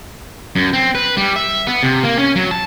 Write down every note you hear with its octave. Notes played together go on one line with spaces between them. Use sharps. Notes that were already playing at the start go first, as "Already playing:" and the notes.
F#2
C4
B4
G3
E5
B3
C3
A#3
C#4
F#3
A5